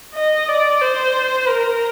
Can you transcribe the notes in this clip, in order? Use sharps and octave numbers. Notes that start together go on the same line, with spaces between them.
D#5
D5
C5
A#4